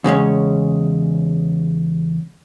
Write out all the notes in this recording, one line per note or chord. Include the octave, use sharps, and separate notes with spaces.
E2 C#3 G#3 C#4